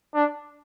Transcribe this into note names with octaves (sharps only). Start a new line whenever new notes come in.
D4